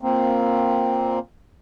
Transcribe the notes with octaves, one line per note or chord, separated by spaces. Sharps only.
A#2 A#3 C4